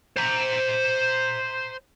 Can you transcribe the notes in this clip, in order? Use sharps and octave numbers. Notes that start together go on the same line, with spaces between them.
C5 A#5